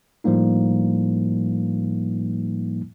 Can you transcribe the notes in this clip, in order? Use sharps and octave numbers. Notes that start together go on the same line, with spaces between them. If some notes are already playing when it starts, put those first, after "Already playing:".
A2 F3 G3 A#3 D#4